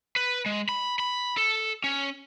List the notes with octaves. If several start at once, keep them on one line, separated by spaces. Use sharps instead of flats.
B4
G#3
B5
B5
A4
C#4